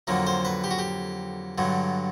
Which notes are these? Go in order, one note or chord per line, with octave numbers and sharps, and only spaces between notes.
F2 D3 F#3 A#3
C5
B4
G4
F#4
G4
G2 D3 F#3